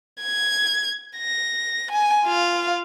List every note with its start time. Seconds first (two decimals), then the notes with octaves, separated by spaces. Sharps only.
0.22 G#6
1.17 A#6
1.91 G#5
2.24 F4 F5